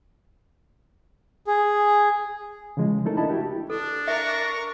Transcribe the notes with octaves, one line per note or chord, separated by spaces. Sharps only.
G#4
C#3 E3 F3 G#3
A3 C4 D#4 E4 A4 A#4
D4 E4 D#5 A5 B5
E4 F#4 G4
D4 A4
A#4 E5 C#6